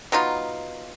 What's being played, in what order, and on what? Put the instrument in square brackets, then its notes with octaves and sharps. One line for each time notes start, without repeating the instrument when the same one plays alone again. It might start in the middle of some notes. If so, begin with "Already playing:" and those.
[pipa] F#3 B3 D#4 F4